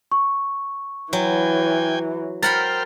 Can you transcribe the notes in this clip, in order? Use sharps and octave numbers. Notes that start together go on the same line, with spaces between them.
C#6
E3 F#3 G5 G#5
A#4 C5 F#5 G5 B5 F6 A6